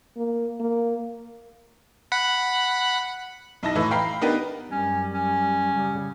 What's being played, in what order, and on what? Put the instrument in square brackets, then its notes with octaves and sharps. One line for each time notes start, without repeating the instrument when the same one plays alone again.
[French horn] A#3
A#3
[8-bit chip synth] F#5 B5
[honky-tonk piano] B1 D#4 E4 A5 A#6
A2 E3 A3
F5 G5 A#5 B5 C7
B3 D4 D#4 G4 A#4 B4
[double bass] F#2 G3 [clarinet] C#4
[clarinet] C#4
[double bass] C#3 G3